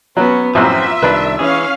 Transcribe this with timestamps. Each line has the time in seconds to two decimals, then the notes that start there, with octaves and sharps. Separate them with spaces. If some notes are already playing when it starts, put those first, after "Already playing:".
0.16 F#3 B3 C#4
0.55 A1 F#2 F3 C4 F4 E5
1.03 C2 D#3 D4 B4
1.39 E3 C#4 G#4 F5